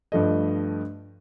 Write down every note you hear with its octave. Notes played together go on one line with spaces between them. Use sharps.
G2 F3 A3 D#5